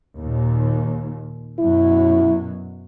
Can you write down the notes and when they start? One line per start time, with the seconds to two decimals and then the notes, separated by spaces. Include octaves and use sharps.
0.17 D#2 A#2
1.59 F#2 B2 F#3 E4